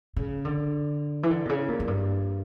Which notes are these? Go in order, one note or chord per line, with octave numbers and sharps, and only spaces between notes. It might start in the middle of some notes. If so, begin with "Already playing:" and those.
C#3
D3
E3
D3
B2
C#3
A#2
F#2
G2